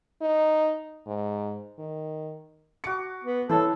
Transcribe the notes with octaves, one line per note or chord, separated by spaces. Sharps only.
D#4
G#2
D#3
F#4 D6 C#7
B3
E3 A4 C5 C#5 A5